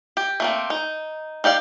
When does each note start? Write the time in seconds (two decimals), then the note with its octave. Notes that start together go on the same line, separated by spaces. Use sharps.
0.17 G4
0.40 A3 A#3 C4
0.70 D#4
1.44 D#4 G4 D5 F5